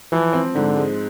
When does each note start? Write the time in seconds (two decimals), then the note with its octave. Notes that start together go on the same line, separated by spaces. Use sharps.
0.12 E3 F3
0.33 C4
0.55 G#2 D3
0.76 G#3